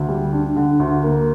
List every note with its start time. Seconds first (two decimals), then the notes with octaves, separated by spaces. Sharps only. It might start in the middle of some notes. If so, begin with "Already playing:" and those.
Already playing: D2
0.09 G3
0.32 D4
0.56 D3
0.79 D2
1.03 A#3